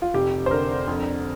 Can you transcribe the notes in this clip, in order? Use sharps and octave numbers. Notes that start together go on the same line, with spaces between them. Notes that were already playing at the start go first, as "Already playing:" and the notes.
F4
F1 G4
C5
D3 A#4
F2